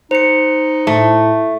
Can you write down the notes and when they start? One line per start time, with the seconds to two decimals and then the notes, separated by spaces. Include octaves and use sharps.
0.11 D#4 C5 C#7
0.87 A2 A3